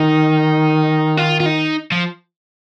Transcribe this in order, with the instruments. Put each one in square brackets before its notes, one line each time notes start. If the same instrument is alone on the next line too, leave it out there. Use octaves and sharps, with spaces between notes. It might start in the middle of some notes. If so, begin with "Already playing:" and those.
Already playing: [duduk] D#3 [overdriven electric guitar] D#4
[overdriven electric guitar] F4
F4
D#4
F3